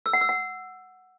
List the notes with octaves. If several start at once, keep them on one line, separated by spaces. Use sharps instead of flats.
E6
F#5
E6
F#5